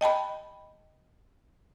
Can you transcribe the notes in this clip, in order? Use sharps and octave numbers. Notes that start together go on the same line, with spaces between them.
D#5 G5 A5 B5